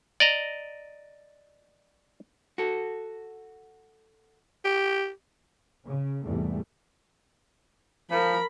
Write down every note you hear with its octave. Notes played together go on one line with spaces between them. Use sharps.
D5 D#5 A#5
F#4 A4
G4
C#3
E2 G#2 C3 E3 G3 A3
F3 A#4 B5